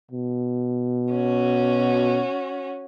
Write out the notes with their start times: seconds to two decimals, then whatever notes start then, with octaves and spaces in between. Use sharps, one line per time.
0.11 B2
1.14 C#4 F#4